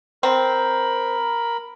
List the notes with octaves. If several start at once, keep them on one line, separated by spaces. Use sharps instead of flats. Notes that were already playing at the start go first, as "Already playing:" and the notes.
C4 A#4 B5